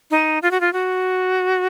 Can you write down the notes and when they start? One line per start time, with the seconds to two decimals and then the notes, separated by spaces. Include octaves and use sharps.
0.11 D#4
0.42 F4
0.51 F#4
0.61 F4
0.73 F#4